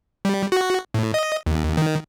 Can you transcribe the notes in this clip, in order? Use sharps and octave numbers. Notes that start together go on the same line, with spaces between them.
G3
F#4
A2
D#5
D#2
D#3